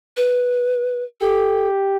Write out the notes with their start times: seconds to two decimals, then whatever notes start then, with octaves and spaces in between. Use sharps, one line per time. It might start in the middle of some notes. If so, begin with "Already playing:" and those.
0.17 B4
1.21 G4 A4